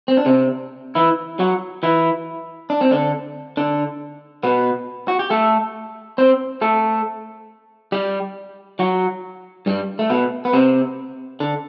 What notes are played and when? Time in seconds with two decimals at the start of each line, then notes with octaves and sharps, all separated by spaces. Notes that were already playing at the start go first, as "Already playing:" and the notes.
0.08 C4
0.17 D4
0.26 C3 C4
0.95 E3 E4
1.39 F#3 F#4
1.83 E3 E4
2.70 D4
2.81 C4
2.91 D3 D4
3.57 D3 D4
4.43 B2 B3
5.08 F#4
5.19 G4
5.30 A3 A4
6.18 C4 C5
6.61 A3 A4
7.92 G3 G4
8.79 F#3 F#4
9.66 G2 G3
9.99 A3
10.10 B2 B3
10.45 B3
10.53 C3 C4
11.40 D3 D4